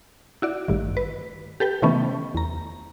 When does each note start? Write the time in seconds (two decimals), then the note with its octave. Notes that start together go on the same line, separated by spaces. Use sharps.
0.42 E4 F#4 D5
0.68 A1 G2 D#3
0.97 B4
1.60 G4 A4 B4 G5
1.82 C3 D#3 E3 A3 B3 C#4
2.35 E2 A#5